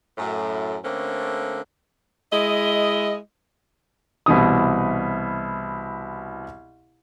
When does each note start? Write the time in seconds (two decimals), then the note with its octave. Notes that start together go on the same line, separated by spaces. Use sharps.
0.18 F#2 A2
0.84 D3 A3 A#3 C4 C#4
2.32 G#3 E4 D#5
4.26 C2 B2 E3 D#6